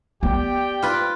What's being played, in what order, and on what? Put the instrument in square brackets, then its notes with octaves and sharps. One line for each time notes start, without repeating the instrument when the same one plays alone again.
[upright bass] B3 [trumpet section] G4 D5 G5
[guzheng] F4 B4